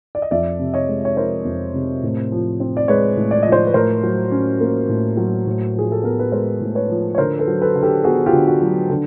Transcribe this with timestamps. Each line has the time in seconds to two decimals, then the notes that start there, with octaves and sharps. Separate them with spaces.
0.15 D5
0.22 D#5
0.31 F2 D5 E5
0.59 C3
0.74 C#5 D#5
0.89 G#3
1.05 C#5
1.17 F3 A#4 C5
1.45 F2
1.74 C3
2.03 A2
2.32 F3
2.60 C4
2.77 D5
2.88 G#3 B4 C#5
3.17 A2
3.31 D5
3.43 F3 D#5
3.52 C5 D5
3.67 B4
3.74 A2 A#4 C5
4.03 F#3
4.31 C#4
4.60 A#3
4.89 A2
5.17 F#3
5.46 A2
5.75 F3 G#4
5.92 A4
6.03 B3 A#4
6.19 B4
6.32 G#3 A#4 C5
6.61 A2
6.75 B4 C#5
6.90 F3
7.15 C#5
7.18 D3 A#4 C5
7.39 A4 B4
7.47 F#3
7.62 A4 B4
7.76 D3
7.83 G4 A4
8.04 B3 F#4 G#4
8.26 F4 G4
8.33 D3
8.48 F#4
8.62 F#3
8.90 D3